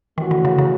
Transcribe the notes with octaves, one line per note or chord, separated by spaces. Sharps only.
D#3 E3 A3 C#4 F#4
D3
C#3
C#3